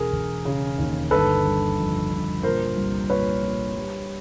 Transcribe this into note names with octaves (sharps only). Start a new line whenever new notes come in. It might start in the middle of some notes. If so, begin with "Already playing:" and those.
Already playing: E1 G#4 A#4
E1
C#3
D#2
G1 A4 B4
G1
F2
G1
A#2 A#4 C5
C2
A#2 B4 C#5
A#2
G3